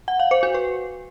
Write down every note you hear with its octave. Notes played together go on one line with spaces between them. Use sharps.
F#5
F5
C5
F#4
B4